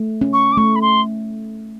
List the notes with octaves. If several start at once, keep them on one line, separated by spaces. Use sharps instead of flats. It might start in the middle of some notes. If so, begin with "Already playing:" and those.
Already playing: A3
C#4
C#6
D6
A3 C#6
B5
C6